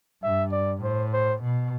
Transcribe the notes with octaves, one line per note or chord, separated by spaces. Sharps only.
G2 E5
D5
A2 C5
C5
B2